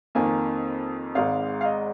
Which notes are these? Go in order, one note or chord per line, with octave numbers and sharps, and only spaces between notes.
F2 D#3 A#3 G#5
G#1 G#2 G#3 F5
F5
D#5